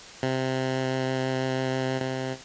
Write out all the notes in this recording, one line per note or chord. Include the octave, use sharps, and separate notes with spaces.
C3
C3